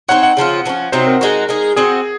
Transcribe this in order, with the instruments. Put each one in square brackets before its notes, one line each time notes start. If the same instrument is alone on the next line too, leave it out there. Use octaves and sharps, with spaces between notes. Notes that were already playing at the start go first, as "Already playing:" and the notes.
[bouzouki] C4 D#4 A#4 C#5 [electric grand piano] F#5
[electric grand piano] F#5
[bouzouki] C#3 F3 C4 F4
F3 A#3
C#4
[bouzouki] C3 F#3 C4 D#4 [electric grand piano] C5
[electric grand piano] A#4
[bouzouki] G#3 D#4 F#4
G#3 D#4 G#4
[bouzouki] C4 F#4 C5 D#5 [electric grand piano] G#4